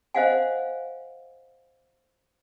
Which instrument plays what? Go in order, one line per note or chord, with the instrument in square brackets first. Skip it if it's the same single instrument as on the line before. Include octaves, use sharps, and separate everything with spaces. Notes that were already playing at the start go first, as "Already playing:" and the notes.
[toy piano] C5 D#5 F5 F#5 G#5